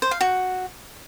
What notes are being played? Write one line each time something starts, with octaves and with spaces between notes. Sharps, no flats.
C5
F5
F#4